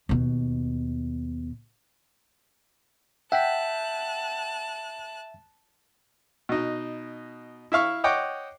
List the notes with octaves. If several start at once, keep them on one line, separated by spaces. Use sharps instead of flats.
D#2 B2
E5 F#5 G5 A5 F#6 B6
B2 D#4
E4 E5 F5 C#6
C#5 D#5 F#5 G5 D6